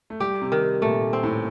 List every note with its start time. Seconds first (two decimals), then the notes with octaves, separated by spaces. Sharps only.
0.10 A3
0.20 G3 G4
0.41 C3
0.52 D#3
0.82 A#2 A3
1.13 C4
1.23 A2